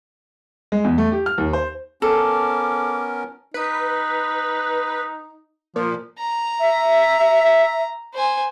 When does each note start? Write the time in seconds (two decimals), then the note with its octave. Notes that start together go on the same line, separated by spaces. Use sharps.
0.72 G#3
0.84 E2
0.98 A3
1.12 G4
1.26 F6
1.38 D#2
1.53 C5
2.02 B3 C#4 A4 A#4 D6
3.54 D#4 B4
5.76 A#2 F3
6.19 A#5
6.60 E5
8.14 C5 G#5